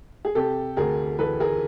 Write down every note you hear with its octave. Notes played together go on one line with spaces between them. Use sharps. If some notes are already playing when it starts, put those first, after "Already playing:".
G#4
C3 G4 A4
D2 G#4 A#4
E3 A4 B4
G#4 A#4